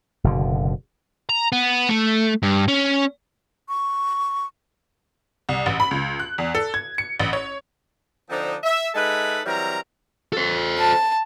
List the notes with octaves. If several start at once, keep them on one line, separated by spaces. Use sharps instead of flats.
F#1 B2 D3
A#5
B3
A3
G2
C#4
C#6
C2
A1
B5
C#2
F#6
E2
A4
G#6
C#7
A1
C#5
D3 F3 C4 D4 D#4
E5
G#3 D#4 A4 B4 E5 B5
E3 F#3 G3 C4 A#4 A#5
A4 C5
A5